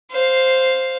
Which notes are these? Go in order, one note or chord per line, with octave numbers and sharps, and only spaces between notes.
C5 F5